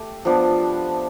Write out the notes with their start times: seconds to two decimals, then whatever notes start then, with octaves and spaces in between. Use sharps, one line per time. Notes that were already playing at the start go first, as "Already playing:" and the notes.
Already playing: A3 G4
0.25 F3 B3 D4